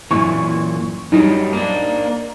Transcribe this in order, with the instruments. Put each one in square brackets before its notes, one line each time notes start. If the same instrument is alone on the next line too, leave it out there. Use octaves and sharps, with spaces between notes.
[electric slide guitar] F#2 A#2 E3 [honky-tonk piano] C#6
[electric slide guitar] F#2 F#3 G3 [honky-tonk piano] D#4
[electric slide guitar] A#3 D4